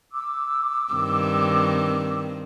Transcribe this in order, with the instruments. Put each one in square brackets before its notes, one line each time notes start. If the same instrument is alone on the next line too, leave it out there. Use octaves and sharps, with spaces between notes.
[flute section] D6 E6
[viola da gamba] G2 D#3 C4